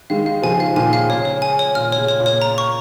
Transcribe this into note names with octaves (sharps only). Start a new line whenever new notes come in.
D#3 G#3 F5
F5
C#3 F3 G#5
F5
A#2 D#3 G#5
F5
C#3 C#5
C#5
G#5
C#5
A#2 F6
C#5
C#3
C#5
A#2
C#5
A#5
C#6